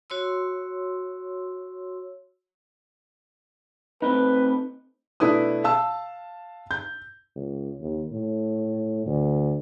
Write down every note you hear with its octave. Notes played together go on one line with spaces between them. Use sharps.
F#4 C#5 C6 E6
A3 C4 D#4 B4
B2 A3 D4 E4 B4 D#6
F5 A5 E6
G6
C#2
D#2
A2
D2